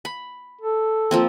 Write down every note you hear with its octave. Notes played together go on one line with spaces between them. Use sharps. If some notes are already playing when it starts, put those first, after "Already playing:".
B5
A4
F3 A#3 C4